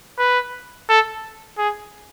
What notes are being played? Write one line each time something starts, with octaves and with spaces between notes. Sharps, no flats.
B4
A4
G#4